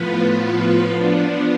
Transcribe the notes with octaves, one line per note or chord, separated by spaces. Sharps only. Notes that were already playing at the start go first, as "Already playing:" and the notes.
Already playing: A2 F3 B3 F4 B4
F3 B3 D4